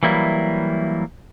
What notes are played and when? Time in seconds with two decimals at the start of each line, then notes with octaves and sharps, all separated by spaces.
0.03 E3 F#3 G3 A#3 E4